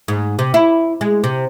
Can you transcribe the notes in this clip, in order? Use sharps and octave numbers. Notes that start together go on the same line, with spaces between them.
G#2
C3
E4
G#3
C3